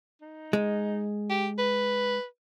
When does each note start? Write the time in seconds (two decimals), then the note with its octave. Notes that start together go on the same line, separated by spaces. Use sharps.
0.21 D#4
0.53 G#3
1.30 G4
1.58 B4